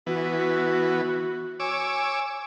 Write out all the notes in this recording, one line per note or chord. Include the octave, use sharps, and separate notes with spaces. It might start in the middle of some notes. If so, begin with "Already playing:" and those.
E3 B3 F#4
C#5 G#5 D6 E6